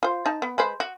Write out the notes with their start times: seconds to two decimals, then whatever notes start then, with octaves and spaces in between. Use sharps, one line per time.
0.03 F4 C5
0.26 D#4 A5
0.42 B3
0.58 G#3 B4 C5
0.80 F#4